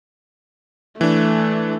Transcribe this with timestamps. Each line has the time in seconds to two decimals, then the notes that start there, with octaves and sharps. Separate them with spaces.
1.01 E3 A3 D4